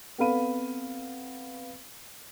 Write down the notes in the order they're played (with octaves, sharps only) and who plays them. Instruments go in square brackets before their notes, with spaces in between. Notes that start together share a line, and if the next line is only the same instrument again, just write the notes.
[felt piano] B3 C4 A4 F5 B5 D#7